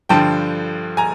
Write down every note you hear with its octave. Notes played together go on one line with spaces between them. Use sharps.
G2 D3 F3 G5 A5
G#5 A#5